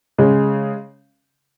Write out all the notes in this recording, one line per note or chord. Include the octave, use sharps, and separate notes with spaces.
C#3 G#3